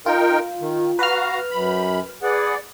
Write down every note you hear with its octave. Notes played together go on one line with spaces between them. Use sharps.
D#4 F4 A#4 G5
D#3
F#4 B4 F5 A#5 F6
F#2 B5
G#4 B4 D5 F#5